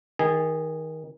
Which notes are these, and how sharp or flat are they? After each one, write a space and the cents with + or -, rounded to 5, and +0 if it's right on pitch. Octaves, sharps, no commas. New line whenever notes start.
D#3 +25 G#4 -15